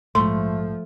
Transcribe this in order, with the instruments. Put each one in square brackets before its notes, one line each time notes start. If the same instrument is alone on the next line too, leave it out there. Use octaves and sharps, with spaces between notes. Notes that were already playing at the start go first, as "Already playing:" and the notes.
[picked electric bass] A#1 G#2 G#3 [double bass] F3 [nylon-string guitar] A3 [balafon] C6